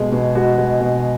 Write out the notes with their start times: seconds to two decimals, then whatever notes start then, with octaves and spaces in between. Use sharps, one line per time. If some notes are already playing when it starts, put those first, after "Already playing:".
Already playing: B2 G#3 G#4
0.12 B2
0.35 G#3 F#4
0.58 G#3
0.80 B2